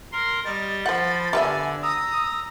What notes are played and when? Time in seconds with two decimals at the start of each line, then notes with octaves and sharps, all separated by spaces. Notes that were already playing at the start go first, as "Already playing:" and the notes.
0.12 A#4 C6
0.45 G3 D#5 A6
0.86 F3 C5 F#5 B5
1.33 D3 G3 B3 E5 G#5
1.83 A#5 D#6 E6